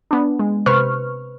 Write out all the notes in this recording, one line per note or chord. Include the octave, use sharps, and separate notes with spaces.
B3 D4
G#3
C3 B4 C5 C#6 F6